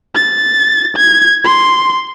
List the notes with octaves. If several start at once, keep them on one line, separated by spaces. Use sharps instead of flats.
A6
G#6
C6